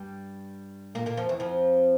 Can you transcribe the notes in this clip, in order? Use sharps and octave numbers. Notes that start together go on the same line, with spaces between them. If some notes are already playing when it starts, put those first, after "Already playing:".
Already playing: G2 G3
A#2 A#3
A#2 A#3
F2 F3
E2 E3
F2 F3